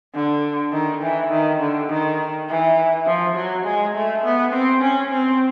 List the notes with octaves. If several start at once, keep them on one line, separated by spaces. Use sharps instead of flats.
D3
D#3
E3
D#3
D3
D#3
E3
F3
F#3
G#3
A3
B3
C4
C#4
C4